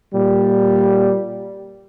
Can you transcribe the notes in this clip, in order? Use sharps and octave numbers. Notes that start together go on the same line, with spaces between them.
A#2 G3